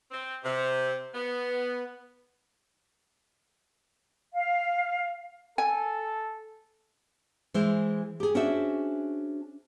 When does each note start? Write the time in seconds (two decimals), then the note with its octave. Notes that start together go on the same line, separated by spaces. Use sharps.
0.11 C4
0.43 C3
1.13 B3
4.33 F5
5.58 A4 G#5
7.54 E3 G#3 E4 C5
8.20 G4 G#4
8.35 C#4 D4 F#4 G#4 C5 E5